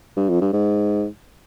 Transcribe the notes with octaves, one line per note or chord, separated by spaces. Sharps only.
G2
F2
G2
G#2